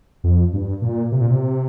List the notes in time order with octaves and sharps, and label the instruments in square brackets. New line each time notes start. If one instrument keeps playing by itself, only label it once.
[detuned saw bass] F2
G2
A#2
C3
A#2
C3